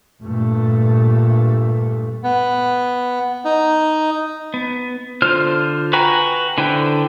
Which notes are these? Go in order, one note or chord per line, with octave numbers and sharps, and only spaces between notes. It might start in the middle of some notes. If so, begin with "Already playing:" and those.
G2 A#2 A3
B3
D#4
B3
D3 F4 C5 F6
F#4 B4 G5 G#5 A#5
D3 E4 B4 C5 G5